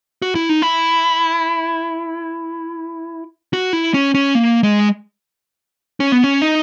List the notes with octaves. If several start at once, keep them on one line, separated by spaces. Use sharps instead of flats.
F#4
E4
D#4
E4
F#4
E4
C#4
C#4
A#3
G#3
C#4
B3
C#4
D#4